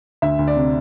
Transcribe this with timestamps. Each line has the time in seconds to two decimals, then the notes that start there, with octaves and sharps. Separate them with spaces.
0.22 D2 E5
0.39 D2
0.48 D5
0.56 C3